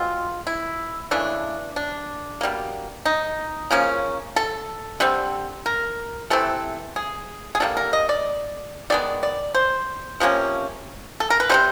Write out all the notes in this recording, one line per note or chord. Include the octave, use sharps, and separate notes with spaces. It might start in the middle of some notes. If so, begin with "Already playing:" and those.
Already playing: B2 G#3 C4 F4
E4
C#3 E3 A3 D4
D4
B2 G3 A#3
D#4
C#3 F3 A#3 C#4
A4
D3 G3 C4
A#4
C3 E3 A3 C4 A4
G#4
G#4
D3 G3 A#3 A4
A#4
D#5
D5
D#3 G#3 B3 D5
D5
C5
C3 F3 A#3 C#4
A4
A#4
B4
C3 D#3 G3 C5